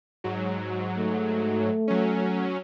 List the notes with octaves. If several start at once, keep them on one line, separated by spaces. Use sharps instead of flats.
G#2 F#3
A3
F#3 C#4